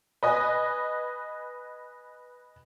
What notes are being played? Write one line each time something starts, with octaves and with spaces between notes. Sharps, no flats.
B4 D#5 G#5